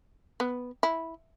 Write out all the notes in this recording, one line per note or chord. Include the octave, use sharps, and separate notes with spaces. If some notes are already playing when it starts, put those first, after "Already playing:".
B3
E4